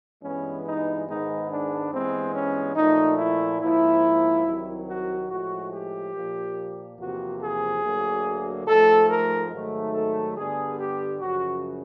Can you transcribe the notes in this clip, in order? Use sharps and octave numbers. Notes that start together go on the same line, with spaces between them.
G2 E3 G#3 B3 C#4
D#4
G#2 D#3 G#3 B3 D#4
D4
G2 E3 G#3 B3 C4
C#4
A#2 F3 A3 D#4
E4
G#2 F3 A#3 E4
C2 C3 D#3 F#3
F#4
A2 F3 G#3 F#4
G4
A#2 F3 A#3
E2 C3 F3 A#3 F#4
G#4
D2 D3 F#3 A#3
G#2 F3 A3 A4
A#4
G#2 D#3 F#3 A3
A4
G2 D3 G3 B3 G#4
G4
F#2 C#3 F3 F#4